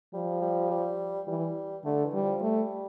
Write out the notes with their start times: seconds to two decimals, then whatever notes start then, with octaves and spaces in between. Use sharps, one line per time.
0.13 F3 G3
0.42 G3
0.71 G3
1.28 E3 G3
1.85 D3 A3
2.04 E3
2.14 G3
2.23 F3
2.41 G3 A3